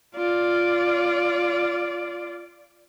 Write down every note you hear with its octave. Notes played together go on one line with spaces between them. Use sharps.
F4 D5